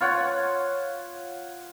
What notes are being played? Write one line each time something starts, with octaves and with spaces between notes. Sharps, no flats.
F4 C#5 F#5